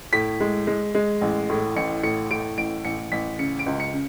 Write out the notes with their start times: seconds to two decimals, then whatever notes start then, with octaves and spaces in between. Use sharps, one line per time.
0.13 A2 B6
0.40 G#3
0.67 G#3
0.95 G#3
1.21 A1
1.50 A2
1.76 A1 C#7
2.03 A2 C#7
2.31 A2 D7
2.57 A1 D7
2.85 A1 C#7
3.12 A1 B6
3.39 C#3 C#7
3.59 D7
3.66 C#2
3.80 C#7
3.93 C#3